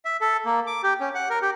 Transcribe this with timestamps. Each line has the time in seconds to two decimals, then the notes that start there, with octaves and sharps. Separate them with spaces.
0.05 E5
0.21 A4
0.45 A#3
0.67 D6
0.83 G4
1.00 C#4
1.15 F#5
1.30 A#4
1.42 G4